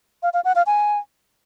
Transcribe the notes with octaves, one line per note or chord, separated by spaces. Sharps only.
F5
F5
F#5
F5
G#5